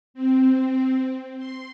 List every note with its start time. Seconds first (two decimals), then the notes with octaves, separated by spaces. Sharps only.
0.14 C4
1.38 C6